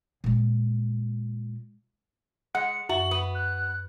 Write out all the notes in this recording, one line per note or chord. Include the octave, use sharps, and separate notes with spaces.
A#2 G#3
G#3 F#5 C#7
F#2 F#4 E5 F#7
B3 D#6
F#6